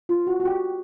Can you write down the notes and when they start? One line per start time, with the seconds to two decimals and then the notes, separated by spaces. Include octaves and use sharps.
0.09 F4
0.27 F#4
0.40 F#4
0.45 G4